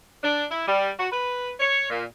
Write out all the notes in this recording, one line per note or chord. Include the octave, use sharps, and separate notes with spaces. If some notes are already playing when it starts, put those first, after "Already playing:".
D4
E4
G3
F#4
B4
C#5
A#2